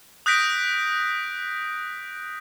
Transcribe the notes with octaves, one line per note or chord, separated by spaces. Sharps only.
D#6 F#6 G6 A#6 B6 D7